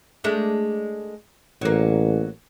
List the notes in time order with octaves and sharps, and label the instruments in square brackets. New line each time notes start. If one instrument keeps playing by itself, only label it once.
[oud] G#3 A3 D4
[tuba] A1 [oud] F#3 A#3